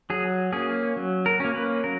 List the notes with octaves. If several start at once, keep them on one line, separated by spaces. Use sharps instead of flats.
F#3 G#4
A#3 C#4 G#4
F#3
A#4
A#3 C#4
B4
F#3 A#4